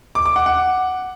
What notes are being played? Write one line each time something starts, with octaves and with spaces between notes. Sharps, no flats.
D6
D6
F#5
F#5